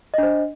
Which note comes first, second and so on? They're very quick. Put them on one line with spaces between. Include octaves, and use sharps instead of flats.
D#5 D4 C5